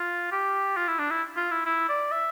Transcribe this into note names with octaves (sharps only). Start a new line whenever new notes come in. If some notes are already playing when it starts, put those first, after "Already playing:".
Already playing: F4
G4
F4
E4
D4
E4
F4
E4
E4
D5
E5